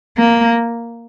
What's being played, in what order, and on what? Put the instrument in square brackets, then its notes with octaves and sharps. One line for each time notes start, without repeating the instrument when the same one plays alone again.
[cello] A#3